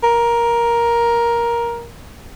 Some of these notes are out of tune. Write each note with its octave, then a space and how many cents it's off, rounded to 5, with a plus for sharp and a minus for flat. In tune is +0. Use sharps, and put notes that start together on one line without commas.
A#4 +10